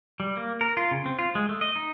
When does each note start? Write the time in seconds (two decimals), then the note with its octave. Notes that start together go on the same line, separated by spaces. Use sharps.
0.20 G3
0.37 A#3
0.61 A#4
0.77 F4
0.91 C#3
1.06 C4
1.19 F4
1.35 G#3
1.49 A3
1.61 D#5
1.76 D#4